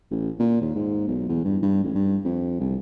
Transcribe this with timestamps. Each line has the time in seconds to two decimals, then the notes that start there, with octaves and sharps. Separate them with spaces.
0.11 A1
0.39 A#2
0.61 D#2
0.75 G#2
1.07 B1
1.29 E2
1.45 G2
1.62 G2
1.84 A1
1.95 G2
2.25 F2
2.60 C2